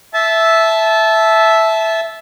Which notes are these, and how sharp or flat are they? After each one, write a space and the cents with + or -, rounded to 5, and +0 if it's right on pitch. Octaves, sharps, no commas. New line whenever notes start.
E5 +0 A5 -20